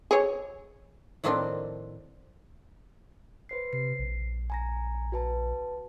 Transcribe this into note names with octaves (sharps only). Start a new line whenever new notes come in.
G#4 C#5
A2 D#3 F3 A#3 C4 D4
B4 C5 C7
C3 C7
A#1
G#5 A#5 A#6
F#4 B4 A5